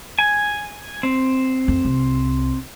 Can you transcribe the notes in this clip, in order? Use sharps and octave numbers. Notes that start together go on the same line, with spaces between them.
G#5
C4
F2
C2